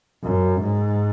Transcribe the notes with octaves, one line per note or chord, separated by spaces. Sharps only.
F#2
G#2